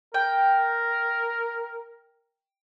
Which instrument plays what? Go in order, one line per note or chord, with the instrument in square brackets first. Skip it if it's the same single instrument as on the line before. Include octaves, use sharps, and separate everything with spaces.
[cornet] A#4 [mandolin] G5